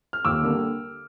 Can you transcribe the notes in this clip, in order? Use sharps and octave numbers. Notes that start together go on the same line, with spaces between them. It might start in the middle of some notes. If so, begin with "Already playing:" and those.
F6
D#2 D6 E6
D3 G3 A#3